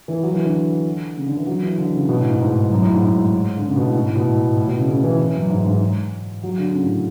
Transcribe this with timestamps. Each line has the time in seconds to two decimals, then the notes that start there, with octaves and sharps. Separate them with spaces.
0.08 E3
0.23 F#3
0.34 E3
0.44 D3
1.17 C#3
1.27 D3
1.37 E3
1.47 F#3
1.63 E3
1.78 D3
1.94 C#3
2.09 B2
2.20 A2
2.29 G#2
2.40 G#2
2.72 F#2
2.82 A2
2.92 G#2
3.02 G#2
3.57 D3
3.66 C#3
3.76 B2
3.85 A2
3.95 G#2
4.06 A2
4.16 B2
4.25 A2
4.57 A2
4.67 B2
4.77 C#3
4.88 C#3
5.04 E3
5.19 E3
5.35 F#2
5.50 G#2
5.66 G#2
6.43 F#3
6.58 D3
6.73 C#3
6.84 A2